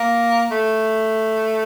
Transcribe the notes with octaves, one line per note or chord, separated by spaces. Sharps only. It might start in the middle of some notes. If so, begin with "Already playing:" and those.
Already playing: A#3
A3